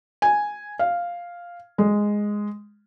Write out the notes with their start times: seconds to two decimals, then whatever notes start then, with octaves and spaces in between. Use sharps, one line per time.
0.22 G#5
0.79 F5
1.78 G#3